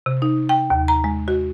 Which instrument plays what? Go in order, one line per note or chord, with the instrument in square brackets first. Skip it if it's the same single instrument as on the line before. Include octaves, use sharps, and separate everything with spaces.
[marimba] C3
D#4
G5
D#2
A#5
G#3
F#4